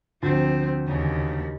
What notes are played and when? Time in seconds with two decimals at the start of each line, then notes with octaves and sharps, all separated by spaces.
0.23 D2 F3 C4
0.88 D#2 C#3